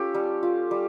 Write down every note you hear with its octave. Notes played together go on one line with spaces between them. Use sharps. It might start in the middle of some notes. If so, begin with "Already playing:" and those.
Already playing: C#4 F4 G4 A4
G3
F4
G3